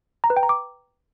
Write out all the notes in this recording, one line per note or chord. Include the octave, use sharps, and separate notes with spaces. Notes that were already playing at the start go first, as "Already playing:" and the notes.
A#5
B4
G5
A#5
D6